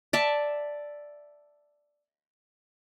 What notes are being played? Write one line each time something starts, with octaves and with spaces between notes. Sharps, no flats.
D5 E5 A5